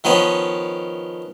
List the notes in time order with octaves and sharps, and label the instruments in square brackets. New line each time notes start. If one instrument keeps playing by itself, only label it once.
[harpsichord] D#3 F3 B3 C#4